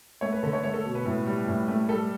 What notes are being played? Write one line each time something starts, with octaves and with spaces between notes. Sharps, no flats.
A3 C#5
B4
D3 A4
C#5
A3 C#5
A4
B2
B4
A2
G3
A2
A3
G3 A4